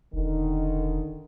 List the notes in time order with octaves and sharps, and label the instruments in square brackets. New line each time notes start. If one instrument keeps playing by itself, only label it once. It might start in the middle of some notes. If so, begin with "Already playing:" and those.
[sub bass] E1 [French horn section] D3 D#3